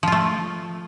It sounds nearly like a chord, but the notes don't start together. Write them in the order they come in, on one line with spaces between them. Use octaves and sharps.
F3 F4 A3